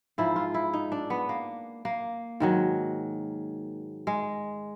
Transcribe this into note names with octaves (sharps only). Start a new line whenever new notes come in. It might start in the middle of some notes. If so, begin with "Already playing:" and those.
G#2 F3 E4
F4
E4
D#4
D4
B3
A#3
A#3
G#2 D#3 F#3
G#3